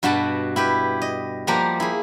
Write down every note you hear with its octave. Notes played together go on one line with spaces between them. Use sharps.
G2 B2 F#4 F#5 A5 B5
E4 G4 B4
D#5
F3 G3 A#3 G4 F#5 A#5
E4 G#4